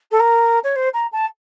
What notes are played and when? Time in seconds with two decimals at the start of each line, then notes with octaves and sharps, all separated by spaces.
0.11 A4
0.20 A#4
0.63 C#5
0.76 C5
0.94 A#5
1.12 A5